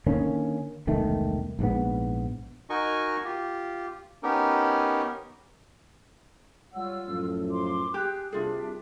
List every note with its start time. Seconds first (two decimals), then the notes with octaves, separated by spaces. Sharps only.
0.06 D3 D#3 A#3 C#4
0.87 E1 C2 D#3 A3
1.59 A#1 G#2 B3
2.70 D#4 F#4 A#4 D#5 G#5 C#6
3.25 F4 G4
4.23 B3 C#4 D#4 G4 A#4
6.74 G3 F4 C#5 F#5 E6
7.06 F#2 A2 F3
7.51 C6 D6
7.94 G4 G#4 F#6
8.33 C2 G3 D4 F4 G#4 E5